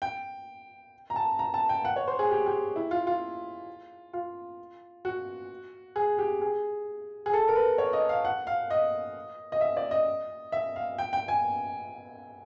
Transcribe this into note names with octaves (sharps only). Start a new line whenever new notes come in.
G5
A#5
A5
A#5
A5
G5
F#5
C#5
C5
G#4
G4
G4
E4
F4
F4
F4
F#4
G#4
G4
G#4
G#4
A4
A#4
B4
C#5
D#5
F5
F#5
F5
D#5
D#5
E5
D5
D#5
E5
F5
G5
G5
G#5